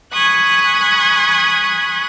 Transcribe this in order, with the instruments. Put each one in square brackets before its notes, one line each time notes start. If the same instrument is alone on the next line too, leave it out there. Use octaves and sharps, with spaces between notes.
[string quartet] G#5 B5 C#6 D#6 F#6